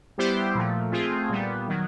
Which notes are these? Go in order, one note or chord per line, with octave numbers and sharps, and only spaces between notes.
G3 B3 E4 G4 C5
A#2 F3 A3
A3 C4 F4 G#4
A#2 G3 B3
D#3 F#3